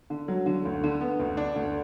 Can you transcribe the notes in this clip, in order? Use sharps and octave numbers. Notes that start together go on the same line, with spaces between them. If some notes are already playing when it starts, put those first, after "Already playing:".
D3
F#3
D3
D2
D3
B3
D2
D4
D2